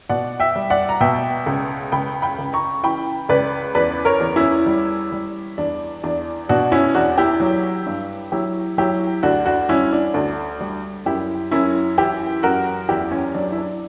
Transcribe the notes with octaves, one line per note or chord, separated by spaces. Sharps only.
B2 D5 F#5
E5 G5
G3
D5 F#5
A#5
B2 E5 G5
C#2
C#2 G5 B5
G5 B5
C#2
A#5 C#6
E3 G5 B5
C#2 B4 D5
E2 B4 D5
A#4 C#5
E2
C#4 E4
G3
G3
E2 D4
E2 D4
B2 D4 F#4
C#4 E4
E2 D4 F#4
E4 G4
F#3
G2
F#3 E4 G4
F#3 E4 G4
D2 D4 F#4
D4 F#4
G3 C#4 E4
D4
D2 D4
G3
F#2 E4 G4
F#2 C#4 E4
E3 E4 G4
F#2 F#4 A#4
E2 E4 G4
C#4
F#3 D4
E4
D4